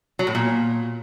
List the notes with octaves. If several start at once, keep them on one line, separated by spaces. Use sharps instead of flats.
F#3
A2
A#2